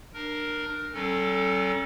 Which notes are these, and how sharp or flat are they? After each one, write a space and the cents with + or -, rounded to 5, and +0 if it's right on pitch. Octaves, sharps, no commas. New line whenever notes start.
D4 +30 A#4 +0
F#3 +45 C#4 -35 A4 +0